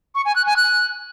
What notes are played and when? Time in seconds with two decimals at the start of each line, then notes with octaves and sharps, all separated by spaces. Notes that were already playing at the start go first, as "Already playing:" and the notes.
0.15 C#6
0.25 G#5
0.36 F#6
0.46 G#5
0.57 F#6